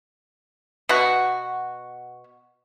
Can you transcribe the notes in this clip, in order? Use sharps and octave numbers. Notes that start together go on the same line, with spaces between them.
B2 F#4